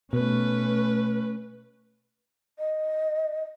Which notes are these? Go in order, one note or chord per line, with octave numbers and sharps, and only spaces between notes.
B2 A3 C#4 B4
D#5